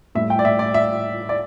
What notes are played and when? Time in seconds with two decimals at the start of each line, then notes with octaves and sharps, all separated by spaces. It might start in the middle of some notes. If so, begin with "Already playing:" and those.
0.15 A2 G3 E5
0.30 G5
0.39 D5
0.45 E5
0.59 D5
0.74 E5
1.29 D5